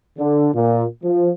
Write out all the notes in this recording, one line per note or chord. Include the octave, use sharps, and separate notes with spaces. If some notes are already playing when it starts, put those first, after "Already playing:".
D3
A#2
F3